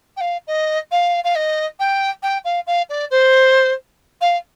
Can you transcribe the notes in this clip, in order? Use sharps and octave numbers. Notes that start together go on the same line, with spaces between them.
G5
F5
D#5
F5
F5
D#5
G5
G5
F5
F5
D5
C5
F5